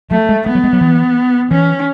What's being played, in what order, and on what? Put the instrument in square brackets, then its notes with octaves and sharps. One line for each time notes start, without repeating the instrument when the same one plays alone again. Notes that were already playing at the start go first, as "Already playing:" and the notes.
[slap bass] F#3 [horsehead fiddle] A3
[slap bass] G#3
[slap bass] A3 [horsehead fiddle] B3
[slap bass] F#3
G#3
F#3
E3
[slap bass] E3 [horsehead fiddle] C#4